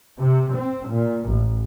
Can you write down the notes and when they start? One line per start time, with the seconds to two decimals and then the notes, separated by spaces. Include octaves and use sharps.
0.18 C3
0.53 C4
0.88 A#2
1.29 A1